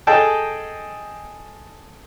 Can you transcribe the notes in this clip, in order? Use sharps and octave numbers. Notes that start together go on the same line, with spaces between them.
G#4 A4 D#5 G5 A5